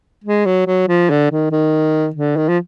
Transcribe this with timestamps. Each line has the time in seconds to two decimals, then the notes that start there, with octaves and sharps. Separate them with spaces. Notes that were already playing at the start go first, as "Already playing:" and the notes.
0.24 G#3
0.45 F#3
0.67 F#3
0.88 F3
1.10 D3
1.31 D#3
1.51 D#3
2.15 D3
2.37 D#3
2.49 F3